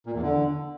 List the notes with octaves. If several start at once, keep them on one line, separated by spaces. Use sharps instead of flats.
A#2
E2
D3